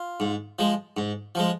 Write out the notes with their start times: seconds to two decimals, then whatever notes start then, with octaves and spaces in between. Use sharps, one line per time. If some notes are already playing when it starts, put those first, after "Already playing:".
Already playing: F4
0.20 G#2
0.59 F3 G#3
0.97 G#2
1.35 F3 G#3